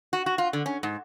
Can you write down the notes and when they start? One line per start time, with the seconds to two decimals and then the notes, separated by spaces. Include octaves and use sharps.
0.13 F#4
0.26 F#4
0.38 F4
0.53 D3
0.66 C#4
0.83 G#2